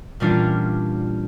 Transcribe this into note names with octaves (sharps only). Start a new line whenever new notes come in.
A#2 E3 G3 C#4 D4 F4